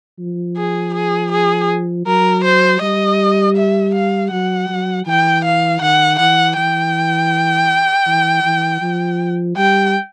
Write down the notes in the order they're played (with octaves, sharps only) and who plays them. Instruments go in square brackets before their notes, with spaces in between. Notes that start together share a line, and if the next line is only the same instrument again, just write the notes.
[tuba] F3
[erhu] G#4
G#4
G#4
[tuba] F#3 [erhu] A#4
[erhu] C5
[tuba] G3 [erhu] D#5
[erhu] E5
F5
[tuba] F#3 [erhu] F#5
[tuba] F#3
[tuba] E3 [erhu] G5
[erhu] F5
[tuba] D#3 [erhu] F#5
[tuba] E3 [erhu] F#5
[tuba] E3 [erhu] G5
[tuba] E3
E3
F3
[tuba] G3 [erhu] G5